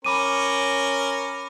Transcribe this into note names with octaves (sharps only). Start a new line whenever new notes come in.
C#4 A#4 B5 D6 D#7